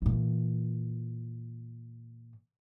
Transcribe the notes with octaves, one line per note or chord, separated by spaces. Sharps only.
A#2 E3